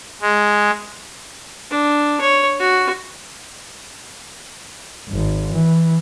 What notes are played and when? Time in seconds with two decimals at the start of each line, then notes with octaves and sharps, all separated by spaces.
0.21 G#3
1.71 D4
2.21 C#5
2.59 F#4
5.09 G#1
5.54 E3